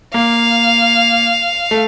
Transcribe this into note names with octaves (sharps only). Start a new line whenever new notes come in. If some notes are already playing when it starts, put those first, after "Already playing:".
A#3 F5
A3